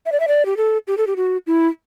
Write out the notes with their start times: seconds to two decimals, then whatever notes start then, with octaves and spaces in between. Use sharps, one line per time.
0.06 E5
0.12 D5
0.20 E5
0.28 D5
0.46 G4
0.57 A4
0.87 G4
0.98 A4
1.07 G4
1.17 F#4
1.47 E4